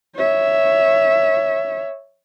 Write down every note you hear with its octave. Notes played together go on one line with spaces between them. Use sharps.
C#5 E5